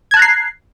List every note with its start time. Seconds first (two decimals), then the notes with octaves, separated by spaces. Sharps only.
0.11 G#6
0.14 A5
0.17 F#6
0.19 A#5
0.22 C7